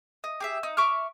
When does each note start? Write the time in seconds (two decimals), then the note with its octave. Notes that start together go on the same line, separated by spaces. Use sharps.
0.24 D#5
0.40 G4 G#4 E5
0.63 D#4
0.77 E5 C#6 D6 F6